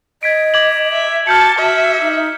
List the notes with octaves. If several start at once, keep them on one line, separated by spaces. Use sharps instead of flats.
D#5 G#6 B6 D7
D6 G#6 F#7
E5
F#4 A5 F6 G6 C#7
F#4 E5
D#4